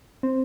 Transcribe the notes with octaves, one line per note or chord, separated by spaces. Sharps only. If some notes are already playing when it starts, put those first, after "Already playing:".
C4